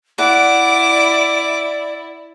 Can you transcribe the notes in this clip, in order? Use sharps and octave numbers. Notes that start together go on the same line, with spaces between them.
E4 D5 F#5 D6